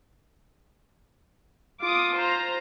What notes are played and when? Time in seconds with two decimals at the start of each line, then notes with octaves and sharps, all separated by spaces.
1.83 F4 D6 D#6
2.16 C5 A#5